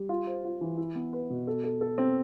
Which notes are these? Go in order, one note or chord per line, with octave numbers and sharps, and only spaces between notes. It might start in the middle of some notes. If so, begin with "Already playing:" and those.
Already playing: G3
F4
C5
F4
E3
E4
B3
B4
B2
A4
A4
A4
C4